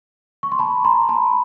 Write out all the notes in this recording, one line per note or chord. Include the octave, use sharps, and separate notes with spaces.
C#6
C6
A5 B5
A#5 C6
A5 B5